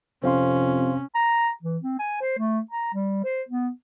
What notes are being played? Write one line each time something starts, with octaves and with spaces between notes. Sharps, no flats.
F2 C3 C#4 C5 F5 C6
A#5
E3
C4
G#5
C5
A3
A#5
G3
C5
B3